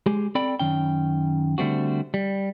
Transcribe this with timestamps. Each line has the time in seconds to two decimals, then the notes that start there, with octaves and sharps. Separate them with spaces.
0.06 G#3 G4 G#4
0.35 C4 A4 D5 G5 B5
0.60 F#2 D#3 C#4 G5
1.58 D3 G3 A3 C4 F#4
2.14 G3